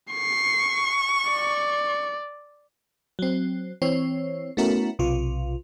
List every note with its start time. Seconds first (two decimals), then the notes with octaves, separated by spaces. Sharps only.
0.13 C#6 C7
1.31 D5
3.19 F#3 C4
3.82 E3 C4 C#5
4.57 A3 B3 C#4 E4 F#4 A#4
4.99 B1 C3 F4